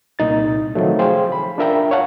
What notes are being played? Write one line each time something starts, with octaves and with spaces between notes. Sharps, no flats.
C2 A#2 D#4 A6
C3 D#3 F3 F#3 A3
G#4 C5 F5 G5 G#5
B5
D4 F4 A#4 E5 G5 A#5
C#5 F5 F#5 A5